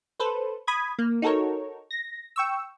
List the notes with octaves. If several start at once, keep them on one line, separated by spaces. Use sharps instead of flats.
A4 B4 C5
B5 D#6 G#6
A#3
D#4 F#4 A4 A#4 C#5
A#6
G5 C#6 E6